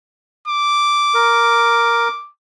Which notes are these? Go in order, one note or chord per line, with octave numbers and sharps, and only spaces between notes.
D6
A#4